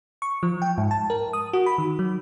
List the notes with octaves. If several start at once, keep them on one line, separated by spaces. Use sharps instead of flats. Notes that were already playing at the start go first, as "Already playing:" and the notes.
C#6
F3
G5
G#2
A5
A#4
D#6
F#4
B5
D#3
F#3